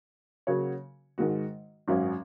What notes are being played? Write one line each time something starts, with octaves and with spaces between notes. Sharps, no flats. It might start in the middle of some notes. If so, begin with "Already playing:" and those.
C#3 F#3 A#3 F#4 C#5
G#2 D#3 G#3 F#4
G#1 F#2 F#3 C#4